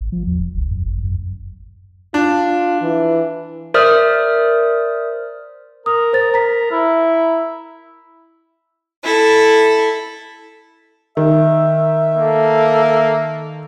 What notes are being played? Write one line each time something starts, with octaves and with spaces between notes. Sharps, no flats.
G#1
F3
E2
F1
C2
F#2
G1
F#2
D4 F4
E3
A#4 C5 D5 E5 D#6 F6
A#4 D#6
C5 A6
A#5 B6
E4
E4 A4
D#3 E5
A#3 A4